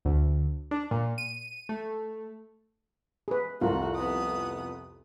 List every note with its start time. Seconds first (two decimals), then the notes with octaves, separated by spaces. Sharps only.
0.05 D2
0.71 D4
0.91 A#2
1.18 D#7
1.69 A3
3.28 G#4 B4
3.61 C2 F2 F4 F#4 A#4
3.95 B3 D#6